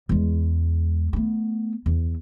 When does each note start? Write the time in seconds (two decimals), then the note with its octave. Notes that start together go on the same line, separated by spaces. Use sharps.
0.09 E2 G#3
1.13 A3 B3
1.86 E2